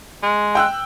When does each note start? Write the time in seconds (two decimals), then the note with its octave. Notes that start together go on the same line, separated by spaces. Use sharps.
0.23 G#3
0.55 G5 E6 F#6